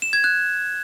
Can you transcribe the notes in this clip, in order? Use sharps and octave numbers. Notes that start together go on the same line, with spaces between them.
E7
G#6
F#6